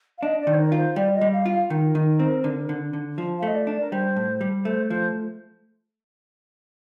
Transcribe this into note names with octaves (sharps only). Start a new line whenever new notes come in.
F5
D4 D#5
D5
D#3
C5
A#4
F4
C5
G3 D5
D#5
G3
F5
F4
F5
D#3 A#4
D#3
C4
D3
D3
D3
F3
F5
A3 D#5
D5
D4
A#4
G3 C5
A2
G3
A3 C5
F3 C5